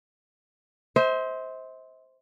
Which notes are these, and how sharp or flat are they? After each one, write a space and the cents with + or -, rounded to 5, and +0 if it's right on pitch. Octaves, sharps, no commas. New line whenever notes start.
C5 +0 E5 -45